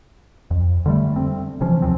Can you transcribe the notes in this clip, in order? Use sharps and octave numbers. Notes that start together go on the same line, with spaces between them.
F2
D3 G3 A3
C4
C3 E3 F3 C#4
D#2 G#2 F3 C4